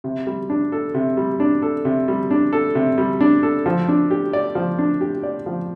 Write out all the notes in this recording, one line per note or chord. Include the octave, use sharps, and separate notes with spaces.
C3
G3
D4
A4
C3
G3
D4
A4
C3
G3
D4
A4
C3
G3
D4
A4
F3
D4
G4
D5
F3
D4
G4
D5
F3